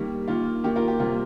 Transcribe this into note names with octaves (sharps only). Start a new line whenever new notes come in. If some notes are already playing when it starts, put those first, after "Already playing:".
Already playing: D#3 G3 A#3
D#3 A#3 F4
D#3 A#3 G4
F4 A#4
G4
C3 G3 A#3 F4